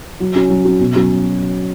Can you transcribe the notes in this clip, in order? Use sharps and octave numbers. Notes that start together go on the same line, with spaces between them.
F#3
C#4 F#4
F#3
C#4 F#4
B2
F#3 C#4 F#4